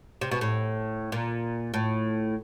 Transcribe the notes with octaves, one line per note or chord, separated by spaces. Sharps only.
C3
B2
A2
A#2
A2